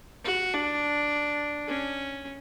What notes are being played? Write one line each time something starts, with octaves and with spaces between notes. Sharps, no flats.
F#4
D4
C#4